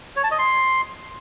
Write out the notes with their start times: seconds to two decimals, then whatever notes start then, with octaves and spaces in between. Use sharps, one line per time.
0.16 C#5
0.24 A5
0.31 D#5
0.39 C6